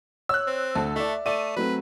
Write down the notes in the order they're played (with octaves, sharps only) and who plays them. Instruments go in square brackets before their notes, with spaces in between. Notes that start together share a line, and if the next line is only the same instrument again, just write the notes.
[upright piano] C#5 [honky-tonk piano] E6 F#6
[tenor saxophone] C4
[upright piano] D2 [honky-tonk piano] A4
[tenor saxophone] A3 [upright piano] D5 E5
[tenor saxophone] A3 [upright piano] D5 [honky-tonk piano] D#7
[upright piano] F#3 A3 C4 [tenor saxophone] B4